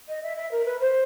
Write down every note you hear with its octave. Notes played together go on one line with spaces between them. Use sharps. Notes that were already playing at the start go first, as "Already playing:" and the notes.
D#5
E5
E5
A#4
B4
C5